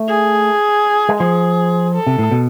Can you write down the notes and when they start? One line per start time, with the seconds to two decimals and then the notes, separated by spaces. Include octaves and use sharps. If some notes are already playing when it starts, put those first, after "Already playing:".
Already playing: A3
0.08 G#4
1.09 G#3
1.20 F3 G#4
1.95 A4
2.07 C3
2.19 A2
2.31 B2